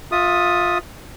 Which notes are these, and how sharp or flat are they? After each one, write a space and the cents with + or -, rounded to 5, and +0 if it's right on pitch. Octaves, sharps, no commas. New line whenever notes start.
F4 +20 E5 -10 D#6 +0